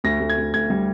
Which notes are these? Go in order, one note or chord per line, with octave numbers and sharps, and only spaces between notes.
D2 A#6
D2
G#6
D2
D2 G#6
G3